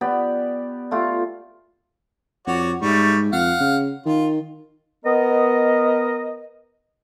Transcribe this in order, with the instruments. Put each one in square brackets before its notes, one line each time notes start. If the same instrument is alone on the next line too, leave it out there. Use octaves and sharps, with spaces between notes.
[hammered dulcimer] B3 G4 D5
A3 F4 G4
[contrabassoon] F2 [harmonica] F#4 C#5 D5
[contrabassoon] G#2 [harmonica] G3 A3 C#6
[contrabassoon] F2 [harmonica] F5 F#5
[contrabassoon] C#3
[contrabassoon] D#3 [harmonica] F4
[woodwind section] B3 A#4 D#5